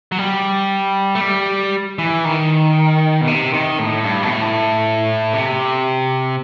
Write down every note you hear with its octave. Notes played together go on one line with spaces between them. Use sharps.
F#3
G3
A3
G3
E3
D#3
B2
C3
D#3
A2
G2
B2
A2
C3